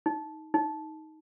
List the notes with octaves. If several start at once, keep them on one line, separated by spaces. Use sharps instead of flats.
D#4
D#4